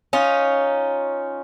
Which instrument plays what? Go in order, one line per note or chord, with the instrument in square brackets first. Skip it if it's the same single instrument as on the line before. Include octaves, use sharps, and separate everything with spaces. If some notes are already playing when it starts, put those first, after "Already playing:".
[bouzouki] C#4 D#4 F4